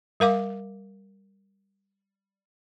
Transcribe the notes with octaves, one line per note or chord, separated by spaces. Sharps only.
G3 A#4 F5 D6